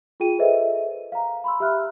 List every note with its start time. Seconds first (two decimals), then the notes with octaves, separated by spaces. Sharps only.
0.20 F4 G#4 G5 D#7
0.39 G#4 A4 B4 C5 D#5 E5
1.12 F5 A#5
1.44 B5 C6 E6
1.60 G4 E5 B5 F6 F#6